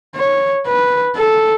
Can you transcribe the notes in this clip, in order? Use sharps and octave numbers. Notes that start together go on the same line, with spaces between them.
C#5
B4
A4